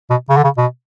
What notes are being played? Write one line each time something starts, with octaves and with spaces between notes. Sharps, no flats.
B2
C#3
D3
C#3
B2